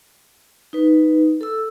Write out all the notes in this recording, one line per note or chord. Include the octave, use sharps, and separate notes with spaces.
D#4 B4
A4 E6